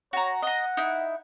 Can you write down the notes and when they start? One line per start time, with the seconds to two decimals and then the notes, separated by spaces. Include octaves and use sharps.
0.13 F#4 C#5 A#5
0.42 D#5 F#5 A#5
0.77 D#4 E4